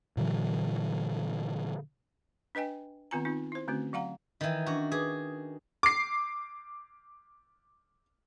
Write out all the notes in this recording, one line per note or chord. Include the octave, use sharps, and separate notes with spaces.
A#2 D3 E3 F#3
D4 B4 D#5 G5 G#5
D#3 B3 C4 F4 G#5 A#5
C4 D#4 F4
E4 C5
D3 A3 C4 C#4 F#4
F#3 F5 F#5 A#5
D#3 E3
C#4 D4 F#4
G#4 B4 D6 D#6
D6 C7